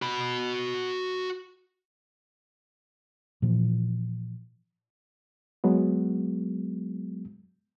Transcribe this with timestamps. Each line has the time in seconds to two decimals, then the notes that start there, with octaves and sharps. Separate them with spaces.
0.02 F#4 B5
3.42 A#2 E3 F3
5.64 F#3 G#3 B3